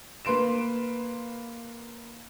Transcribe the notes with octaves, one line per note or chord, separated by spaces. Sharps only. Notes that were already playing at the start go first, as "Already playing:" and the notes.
A#3 B4 C6 D7 E7